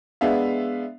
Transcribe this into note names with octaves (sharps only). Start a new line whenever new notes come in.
G#3 B3 D4 E5 F5